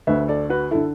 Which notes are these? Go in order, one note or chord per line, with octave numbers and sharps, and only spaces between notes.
D2 D3 B4 E5
A4 D5
F#4 B4
D3 E4 A4